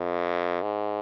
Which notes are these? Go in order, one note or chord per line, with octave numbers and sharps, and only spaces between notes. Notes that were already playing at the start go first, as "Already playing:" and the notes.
Already playing: F2
G#2